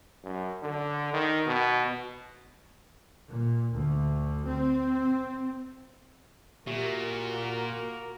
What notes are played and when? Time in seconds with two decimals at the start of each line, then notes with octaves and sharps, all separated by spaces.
0.24 F#2
0.63 D3
1.14 D#3
1.47 B2
3.27 A#2
3.72 D2
4.44 C4
6.67 A#2 F#4 G4 A#4 E5
7.34 A#3